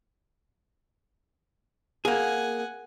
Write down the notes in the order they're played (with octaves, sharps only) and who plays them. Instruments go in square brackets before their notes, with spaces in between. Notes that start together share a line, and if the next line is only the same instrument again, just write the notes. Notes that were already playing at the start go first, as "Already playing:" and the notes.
[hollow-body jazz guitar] A#3 G#4 [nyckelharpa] F#5 G#5